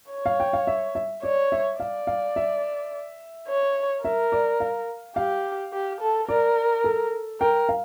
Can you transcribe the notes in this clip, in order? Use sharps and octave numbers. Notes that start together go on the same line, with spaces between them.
C#5
F5
G5
F5
E5
E5
C#5 D5
E5
D5 F5
F5
E5
C#5
A#4 E5
D5
F5
G4 F5
G4
A4
A#4 D5
A4
A#4 G5
F5